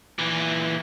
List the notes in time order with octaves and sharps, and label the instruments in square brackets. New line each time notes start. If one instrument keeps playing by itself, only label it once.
[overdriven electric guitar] A#2 E3